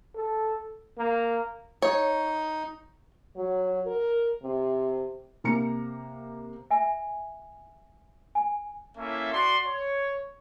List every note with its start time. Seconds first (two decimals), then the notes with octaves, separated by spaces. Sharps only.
0.15 A4
0.98 A#3
1.82 D#4 C#5
3.37 F#3
3.86 A#4
4.43 C3
5.44 C3 A#3 A#5 C#7
6.71 E5 G#5
8.35 G#5
8.97 A#3 C#4 E4 A4 E5
9.33 F#4 D5 C6
9.66 C#5